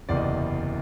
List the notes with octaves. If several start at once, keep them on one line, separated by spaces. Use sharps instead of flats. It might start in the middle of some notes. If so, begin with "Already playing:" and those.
F#1 E2 C3 D5
D#5